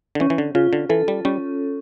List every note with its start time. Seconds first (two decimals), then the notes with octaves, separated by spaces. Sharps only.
0.15 D3
0.20 E3 C#4
0.30 E3
0.38 D3
0.55 C#3 F4
0.73 D3
0.89 E3 A4
1.08 G3
1.25 G3 C#4